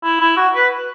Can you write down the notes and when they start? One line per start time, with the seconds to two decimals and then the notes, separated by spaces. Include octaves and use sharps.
0.04 E4
0.20 E4
0.37 F#4
0.55 B4